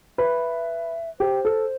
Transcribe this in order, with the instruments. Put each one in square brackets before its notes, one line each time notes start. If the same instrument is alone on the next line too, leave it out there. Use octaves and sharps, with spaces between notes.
[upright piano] B4 [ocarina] E5
[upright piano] G4 [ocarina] C5
[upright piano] A4